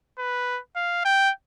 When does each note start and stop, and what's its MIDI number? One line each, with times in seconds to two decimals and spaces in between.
0.19 0.61 71
0.76 1.04 77
1.05 1.31 79